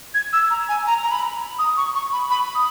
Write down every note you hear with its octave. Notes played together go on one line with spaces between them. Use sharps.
G#6
E6
A#5
G#5
A#5
A#5
B5
D#6
C#6
C#6
B5
B5
D#6